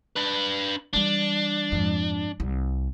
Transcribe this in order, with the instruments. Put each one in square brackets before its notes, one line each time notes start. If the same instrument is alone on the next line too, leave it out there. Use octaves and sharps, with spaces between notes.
[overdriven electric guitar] D4 B4
[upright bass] E3 G3 [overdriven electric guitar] D4
[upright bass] F2 G#2
C2 G3